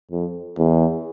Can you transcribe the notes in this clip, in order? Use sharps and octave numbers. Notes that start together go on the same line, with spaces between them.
F2
E2